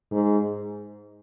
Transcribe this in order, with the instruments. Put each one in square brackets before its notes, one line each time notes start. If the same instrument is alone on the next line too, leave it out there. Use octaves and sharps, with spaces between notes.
[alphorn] G#2